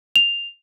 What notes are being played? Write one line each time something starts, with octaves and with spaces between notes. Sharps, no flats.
F7